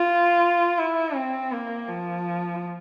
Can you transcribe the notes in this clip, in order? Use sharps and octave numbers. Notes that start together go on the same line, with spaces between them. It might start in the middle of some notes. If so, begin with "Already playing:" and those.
Already playing: F4
E4
C4
A#3
F3